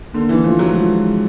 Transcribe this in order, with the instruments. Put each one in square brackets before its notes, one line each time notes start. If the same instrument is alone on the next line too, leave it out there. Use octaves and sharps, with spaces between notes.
[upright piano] D3 [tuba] A#3
[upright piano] E3
[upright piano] F3 [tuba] A3
[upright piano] F#3
[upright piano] F3 [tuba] G#3